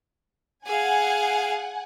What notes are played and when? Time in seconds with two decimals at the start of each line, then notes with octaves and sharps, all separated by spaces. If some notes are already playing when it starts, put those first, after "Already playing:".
0.66 G#4 F5 F#5 G#5